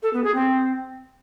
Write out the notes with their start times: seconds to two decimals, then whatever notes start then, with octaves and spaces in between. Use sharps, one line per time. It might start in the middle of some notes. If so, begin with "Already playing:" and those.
0.03 A4
0.13 B3
0.24 G#4
0.35 C4